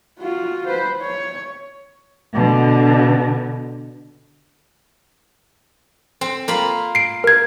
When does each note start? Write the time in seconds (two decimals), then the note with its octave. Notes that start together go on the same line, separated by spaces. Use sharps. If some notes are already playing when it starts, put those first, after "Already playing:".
0.20 F4 F#4
0.67 B4 C5
1.02 C#5
2.33 B2 D3
6.21 C4
6.48 A#3 F4 B5
6.95 C7 D7
7.24 A#4 G#6